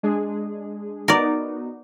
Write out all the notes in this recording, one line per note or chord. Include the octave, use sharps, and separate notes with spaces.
G#3 D4 G#4
B3 D#4 F#4 A#4 D5